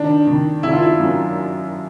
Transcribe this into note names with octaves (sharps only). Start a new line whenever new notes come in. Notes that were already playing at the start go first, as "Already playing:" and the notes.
Already playing: D#3 D4
D#3
D#3 E4
F4
E4
F#2